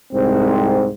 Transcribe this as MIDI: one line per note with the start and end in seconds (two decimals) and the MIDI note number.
0.13 0.90 36
0.13 0.90 44
0.13 0.90 60